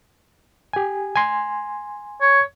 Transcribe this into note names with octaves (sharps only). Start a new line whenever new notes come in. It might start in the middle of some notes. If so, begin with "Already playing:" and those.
G4 G#5
G#5 C6
C#5